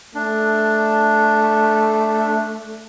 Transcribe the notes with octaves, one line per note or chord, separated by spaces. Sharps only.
A3 D4